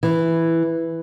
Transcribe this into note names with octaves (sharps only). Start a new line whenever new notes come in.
E3